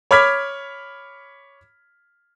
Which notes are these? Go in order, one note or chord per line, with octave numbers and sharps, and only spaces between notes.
C#5 B5 D6 F6 G#6 B6